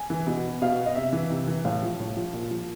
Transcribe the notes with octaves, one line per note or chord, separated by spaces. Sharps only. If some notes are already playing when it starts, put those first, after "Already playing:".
Already playing: G#5
E3
B2
B2 F5
D#5
C3 E5
E3
C3
E3
A2 F5
F3
A2
F3
A#2
F3